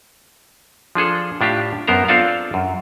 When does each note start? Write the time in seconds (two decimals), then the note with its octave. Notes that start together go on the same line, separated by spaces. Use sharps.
0.95 F3 D4 G#4 A4
1.41 A2 D4 F4 G4
1.87 F#2 B3 A#4 C5 A#5
2.08 C4 D4 F4 A4 D5 F5
2.54 F#2